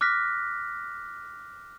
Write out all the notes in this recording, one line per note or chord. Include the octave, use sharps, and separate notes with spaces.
D6 F6 F#6 A#6 B6